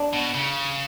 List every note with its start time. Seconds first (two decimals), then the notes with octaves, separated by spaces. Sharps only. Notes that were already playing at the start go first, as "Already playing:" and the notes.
Already playing: D4
0.13 B2
0.34 C#3